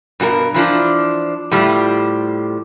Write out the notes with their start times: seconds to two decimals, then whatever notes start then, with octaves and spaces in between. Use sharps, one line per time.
0.20 G2 B2 F#4 A#4
0.54 E3 F3 D4
1.52 A2 F3 G3